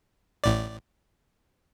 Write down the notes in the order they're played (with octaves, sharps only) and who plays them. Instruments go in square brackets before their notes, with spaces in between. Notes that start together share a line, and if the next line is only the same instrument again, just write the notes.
[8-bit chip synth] A1 A2 D5